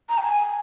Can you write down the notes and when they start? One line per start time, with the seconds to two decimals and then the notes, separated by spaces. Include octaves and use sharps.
0.09 A#5
0.18 G5
0.23 G#5